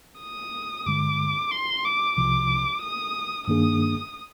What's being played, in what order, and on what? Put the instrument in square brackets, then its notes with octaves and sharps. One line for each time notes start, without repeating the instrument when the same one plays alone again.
[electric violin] D#6
[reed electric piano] G2 D3 G#3 [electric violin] D6
[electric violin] C6
D6
[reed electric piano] C2 C3 F3 [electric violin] D6
[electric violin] D#6
[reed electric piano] G2 D#3 A#3 D4 G#4 [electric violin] D#6